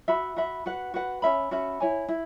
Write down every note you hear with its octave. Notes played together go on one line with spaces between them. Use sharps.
F#4 E5 B5
F#4 E5 B5
F#4 B4 F#5
F#4 B4 F#5
C#4 F#4 E5 B5
C#4 F#4 E5 B5
E4 C#5 G#5
E4